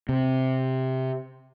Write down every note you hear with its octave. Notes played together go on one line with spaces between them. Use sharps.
C3